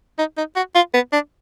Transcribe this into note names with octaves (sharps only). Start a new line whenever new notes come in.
D#4
D#4
F#4
F4
B3
D4